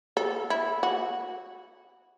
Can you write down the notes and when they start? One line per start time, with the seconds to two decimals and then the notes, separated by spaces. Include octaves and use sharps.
0.17 A4
0.50 E4
0.83 F#4